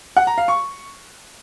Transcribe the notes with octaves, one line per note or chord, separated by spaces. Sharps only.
F#5
A#5
F5
C#6